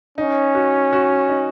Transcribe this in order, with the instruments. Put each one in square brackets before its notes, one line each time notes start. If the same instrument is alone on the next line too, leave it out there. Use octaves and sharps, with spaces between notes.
[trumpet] C#4 [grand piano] D#4
[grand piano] F#4
F#4
D#4